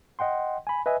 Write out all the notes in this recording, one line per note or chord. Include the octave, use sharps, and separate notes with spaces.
D#5 F#5 G5 C6
G#5 B5
B4 D#5 E5 G#5